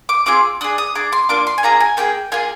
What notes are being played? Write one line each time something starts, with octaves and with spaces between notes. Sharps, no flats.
D6
C4 F4 G#4 D6
D4 G#4 D#6
D#6
D4 G#4 D6
C6
A#3 D4 F4 D6
C6
G#5
A#3 D4 F4 G#4 A#5
G#5
A#3 F4 G#4 G5
A#3 F4 G#4 G#5